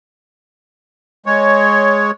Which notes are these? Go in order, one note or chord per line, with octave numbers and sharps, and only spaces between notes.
G#3 C#5